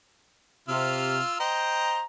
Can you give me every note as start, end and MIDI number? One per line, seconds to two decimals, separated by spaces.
0.68 1.18 48
0.68 1.39 65
0.68 1.39 88
0.68 1.39 89
1.40 2.01 72
1.40 2.01 75
1.40 2.01 79
1.40 2.03 82